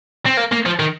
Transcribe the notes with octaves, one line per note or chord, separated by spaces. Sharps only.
C4
A#3
A#3
F3
D#3